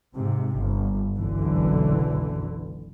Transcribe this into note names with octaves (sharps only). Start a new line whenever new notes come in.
G#2 C3
G1
F#1 B1 D3 E3